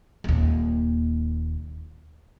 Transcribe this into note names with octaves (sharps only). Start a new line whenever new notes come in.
D#1 D#2